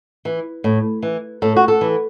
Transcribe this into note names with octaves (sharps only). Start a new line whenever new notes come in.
E3
A2
E3
A2 A4
F#4
A4
E3